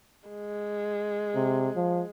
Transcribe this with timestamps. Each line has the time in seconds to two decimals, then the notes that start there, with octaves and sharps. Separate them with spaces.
0.29 G#3
1.35 C3
1.76 F3